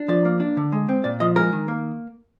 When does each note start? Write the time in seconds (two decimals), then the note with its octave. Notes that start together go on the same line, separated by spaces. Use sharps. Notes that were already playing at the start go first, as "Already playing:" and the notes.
Already playing: D4
0.08 F3 D5
0.25 A#3
0.40 D4
0.57 D3
0.72 G#3
0.89 C4
1.04 A#2 D5
1.20 F3 D#5
1.36 G#3 A#4
1.52 D#3
1.68 A#3